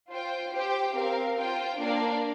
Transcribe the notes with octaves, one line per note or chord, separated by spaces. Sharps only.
F4 C5 G5
G4 C5 G5
C4 A#4 F5
F4 C5 G5
A#3 D4 A#4 D5 F5